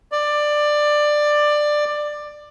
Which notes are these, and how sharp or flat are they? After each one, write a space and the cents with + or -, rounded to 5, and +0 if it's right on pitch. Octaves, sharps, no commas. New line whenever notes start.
D5 +15